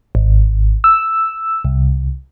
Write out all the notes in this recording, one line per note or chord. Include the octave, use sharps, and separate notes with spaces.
G#1
E6
C2